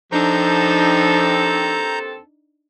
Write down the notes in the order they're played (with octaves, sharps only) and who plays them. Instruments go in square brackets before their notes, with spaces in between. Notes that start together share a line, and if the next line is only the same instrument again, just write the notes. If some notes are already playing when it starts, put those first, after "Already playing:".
[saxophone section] D#2 C4 A4 [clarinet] F3 [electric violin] D4 D#4 [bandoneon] A#5 G6